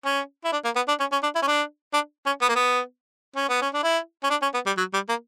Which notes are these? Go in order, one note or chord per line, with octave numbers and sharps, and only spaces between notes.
C#4
E4
D4
A#3
B3
D4
C#4
C#4
D4
E4
C#4
D4
D4
C#4
B3
A#3
B3
C#4
B3
C#4
D4
E4
C#4
D4
C#4
B3
G3
F#3
G3
A#3